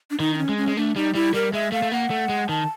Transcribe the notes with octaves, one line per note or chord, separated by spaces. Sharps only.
D4
D#3 D#4
D4
C#4
G#3
C#4
G#3
A3 D4
G3 D#4
G3 E4
G3 A#4
G#3 E5
A3 F5
A3
A#3 F#5
A3
G#3
D#3 A5